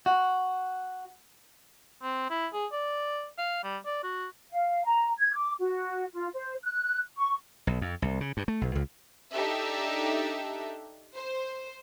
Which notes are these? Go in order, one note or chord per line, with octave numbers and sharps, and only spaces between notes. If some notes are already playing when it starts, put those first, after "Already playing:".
F#4
C4
E4
G#4
D5
F5
G3
D5
F#4
F5
A#5
G#6
D6
F#4
F4
C5
F#6
C#6
B1
F2
C2
C#3
G2
A3
B1
C#2
D4 D#4 G4 A4 E5
C5